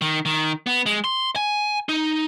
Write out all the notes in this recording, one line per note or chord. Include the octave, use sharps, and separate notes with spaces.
D#3
D#3
B3
G#3
C6
G#5
D#4